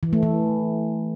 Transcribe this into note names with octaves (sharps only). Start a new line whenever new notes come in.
E3
A3
E3